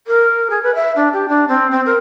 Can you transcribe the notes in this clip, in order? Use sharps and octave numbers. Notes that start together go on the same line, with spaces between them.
A#4
G#4
B4
E5
D4
G4
D4
C4
C4
A#4